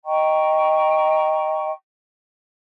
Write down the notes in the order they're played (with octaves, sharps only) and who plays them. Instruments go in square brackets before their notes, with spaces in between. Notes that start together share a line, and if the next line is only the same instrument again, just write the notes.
[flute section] D#5 G5 A#5 C#6